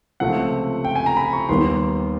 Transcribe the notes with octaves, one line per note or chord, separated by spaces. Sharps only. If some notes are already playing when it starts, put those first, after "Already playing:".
C#2 C3 F3 A3 F#5
G5
G#5
A#5
B5
C#6
D#2 D#3 G3 B3 C6